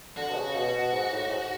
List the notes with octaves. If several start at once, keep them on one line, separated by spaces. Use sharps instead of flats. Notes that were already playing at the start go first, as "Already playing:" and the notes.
D3 F#4
B2
C#3
B2 F#4
B2
G#2
A2
G#2